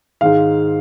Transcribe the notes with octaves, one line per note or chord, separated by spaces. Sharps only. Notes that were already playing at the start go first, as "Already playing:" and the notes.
G#2 D#3 G#3 F5